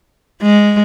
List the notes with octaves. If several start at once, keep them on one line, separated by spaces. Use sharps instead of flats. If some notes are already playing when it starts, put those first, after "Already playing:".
G#3